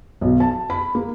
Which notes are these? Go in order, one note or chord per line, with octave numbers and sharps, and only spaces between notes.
B1
A5
B5
A#3